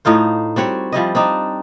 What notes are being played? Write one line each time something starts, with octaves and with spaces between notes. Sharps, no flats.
A2 D#4 F4 C5
G3 C4 F#4 C#5
F3 G3 E4 D#5
C4 D4 D#4